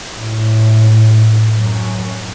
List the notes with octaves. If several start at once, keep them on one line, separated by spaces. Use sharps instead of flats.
A2
F#2